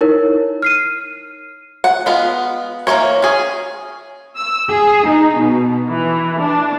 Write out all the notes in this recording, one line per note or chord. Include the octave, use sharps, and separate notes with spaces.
D#4 E4 A#4 C#5
F6 C7 D#7
F#5
G#3 B3 F4
E3 A#3 E4 C5 C#5
C#4 G#4
E6
G#4
D#4
B2
E3
D4